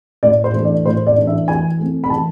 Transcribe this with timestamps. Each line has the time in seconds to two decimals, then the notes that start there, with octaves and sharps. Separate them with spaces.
0.23 A2 D5
0.44 C5
0.54 E3 A3 D4
0.65 D5
0.86 A2 C5
1.07 D5
1.16 E3 A3 D4
1.27 E5
1.48 E3 G#5
1.79 A3 C4
2.04 B5
2.10 E3 A5